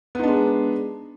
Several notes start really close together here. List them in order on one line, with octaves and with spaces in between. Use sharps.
B3 D#4 D4 G#3